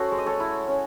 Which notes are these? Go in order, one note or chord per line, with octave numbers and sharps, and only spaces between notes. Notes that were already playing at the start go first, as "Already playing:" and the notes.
Already playing: C#4 F#4 A4 C5 C#5
G#3
D#5
A4 C#5
E4
C#4